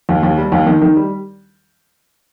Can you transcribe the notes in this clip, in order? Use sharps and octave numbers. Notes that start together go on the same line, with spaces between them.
D#2
D#2
G3
D#2
D#3
D#3
G3